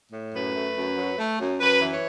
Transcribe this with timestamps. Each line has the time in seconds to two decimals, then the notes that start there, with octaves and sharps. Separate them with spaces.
0.12 A2
0.33 F#2 B4
0.55 A3
0.76 F#2
0.97 F#3
1.18 A3
1.40 F#2
1.60 F#2 B4
1.82 E3
1.92 C#5